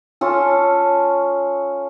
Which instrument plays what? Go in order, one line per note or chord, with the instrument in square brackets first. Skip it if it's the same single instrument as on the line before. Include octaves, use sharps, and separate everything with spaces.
[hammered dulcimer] C#4 F4 A4